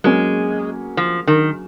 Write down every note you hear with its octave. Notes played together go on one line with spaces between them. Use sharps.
F#3 G#3 A#3 C#4 G#4
F3
D#3